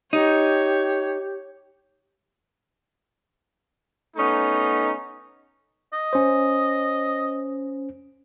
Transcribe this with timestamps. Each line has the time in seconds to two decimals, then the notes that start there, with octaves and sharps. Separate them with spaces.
0.13 D#4 G4 C#5
4.17 A3 B3 C#4 D#4
5.93 D#5
6.13 C#4 C5